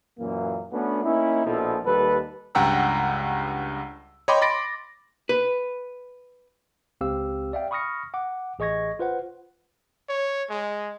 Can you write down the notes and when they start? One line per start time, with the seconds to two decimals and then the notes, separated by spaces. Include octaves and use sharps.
0.19 F#2 A#2 E3 A#3
0.72 A3 B3 C#4 D4 F#4 B4
1.04 A#3 C#4 D#4 E4
1.46 A#1 B2 F3 E4 A4
1.86 D#2 G3 A4 B4
2.55 C#2 G2 F#5 G5 A#5 E6
4.28 C#5 D#5 G5 B5 C6 D6
4.42 B5 C6 A6 A#6 D7
5.29 B4
7.01 C#2 C4 G4 F5 E6
7.53 D5 E5 F5 G5
7.71 B5 C#6 D#6 F6 A#6 C#7
8.14 F#5 D6
8.59 A1 G#4 D#5 C#6 G#6 A#6
8.99 F4 B4 C5 F#5
10.09 C#5
10.50 G#3